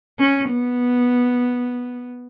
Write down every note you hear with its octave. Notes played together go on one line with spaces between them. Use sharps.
C#4
B3